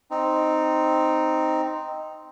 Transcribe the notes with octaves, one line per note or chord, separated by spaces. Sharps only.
C4 D#4